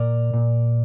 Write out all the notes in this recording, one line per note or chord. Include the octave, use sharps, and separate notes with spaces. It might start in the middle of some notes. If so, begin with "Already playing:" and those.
Already playing: A#2 A#4 D5
A#2